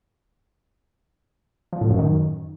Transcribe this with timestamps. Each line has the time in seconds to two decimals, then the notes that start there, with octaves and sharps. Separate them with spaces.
1.73 F3
1.81 A2
1.90 F#2
1.99 D#3